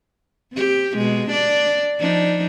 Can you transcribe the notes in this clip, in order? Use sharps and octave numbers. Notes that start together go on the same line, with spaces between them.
C4 G4
B2 G#3
D4 D5
F3 D4 D#4